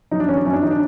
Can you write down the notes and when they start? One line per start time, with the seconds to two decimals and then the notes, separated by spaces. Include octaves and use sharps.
0.11 F#2 D#4
0.20 D4
0.28 D#3 C#4
0.37 D4
0.45 F#2 C#4
0.53 D4
0.62 D#3 D#4
0.71 D4